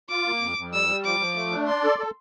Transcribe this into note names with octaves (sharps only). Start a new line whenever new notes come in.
F4 D6
A#3
F2
F2
G3 E6
G3
F3 D6
F3
A3
D4
D5 C6
A4
A4